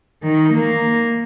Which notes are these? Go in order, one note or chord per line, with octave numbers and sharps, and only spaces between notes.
D#3
A#3